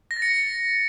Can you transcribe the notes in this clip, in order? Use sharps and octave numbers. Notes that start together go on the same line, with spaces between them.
A#6
A6
C#7